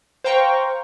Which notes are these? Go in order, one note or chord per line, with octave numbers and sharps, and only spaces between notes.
C5 F5 G5 A#5 C#6